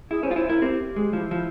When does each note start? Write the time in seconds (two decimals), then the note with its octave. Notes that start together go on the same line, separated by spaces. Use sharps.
0.10 E4 G#4
0.23 C#4 C5
0.31 F4
0.36 E4 C5
0.49 E4 A#4
0.62 C4 G4
0.96 G#3
1.13 F3 E4
1.31 F3